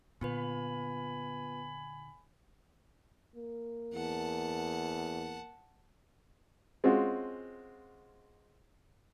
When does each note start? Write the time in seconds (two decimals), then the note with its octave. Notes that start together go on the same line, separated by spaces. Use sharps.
0.21 A#2 D3 B3 F4 B4 G#5 B5
3.36 A#3
3.94 E2 F#5 A5
6.84 G#3 C4 C#4 F4 F#4